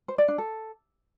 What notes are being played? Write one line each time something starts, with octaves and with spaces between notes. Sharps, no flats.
C5
D5
D4
A4